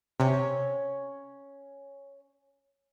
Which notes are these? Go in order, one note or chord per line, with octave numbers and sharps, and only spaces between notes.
C3 C#4 C#5